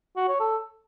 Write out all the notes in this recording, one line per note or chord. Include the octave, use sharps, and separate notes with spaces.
F#4
C#5
A4